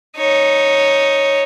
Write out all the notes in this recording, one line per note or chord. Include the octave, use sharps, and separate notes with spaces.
D#4 C#5